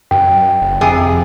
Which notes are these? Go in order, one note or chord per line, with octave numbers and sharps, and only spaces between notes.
F#2 G5
F#1
F2 C3 G#4